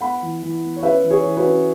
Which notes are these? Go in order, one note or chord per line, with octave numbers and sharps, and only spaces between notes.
B3 F#5 B5
E3
E3
B3
C#5
C#4 B4 E5
E3
G#4 C#5
E3
F#4 B4
C#4